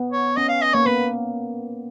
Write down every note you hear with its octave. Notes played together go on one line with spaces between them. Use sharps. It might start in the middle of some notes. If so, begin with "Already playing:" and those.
Already playing: B3
C#5
C#4 D#5
F5
D#5
A#3 C#5
B3 B4